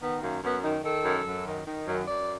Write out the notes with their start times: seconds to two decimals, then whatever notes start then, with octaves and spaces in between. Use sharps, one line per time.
0.02 D#3 B3
0.22 F#2 A#3
0.43 F#2 B3
0.64 D#3 D#4
0.84 D#3 A4
1.05 F#2
1.26 F#2
1.46 D#3
1.67 D#3
1.87 F#2
2.08 F#2 D5